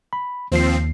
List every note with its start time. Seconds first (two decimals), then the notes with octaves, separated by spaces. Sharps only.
0.13 B5
0.52 D#2 F3 C4 C7